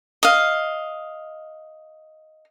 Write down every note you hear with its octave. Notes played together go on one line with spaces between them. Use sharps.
D#5 F5